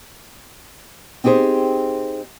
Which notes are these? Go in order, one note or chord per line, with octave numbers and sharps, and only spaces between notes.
C4 D#4 G4 G#4 C5